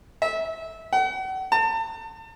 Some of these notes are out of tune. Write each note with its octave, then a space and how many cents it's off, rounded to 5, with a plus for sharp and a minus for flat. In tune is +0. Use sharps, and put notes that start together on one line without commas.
E5 -20
F#5 +40
A5 +35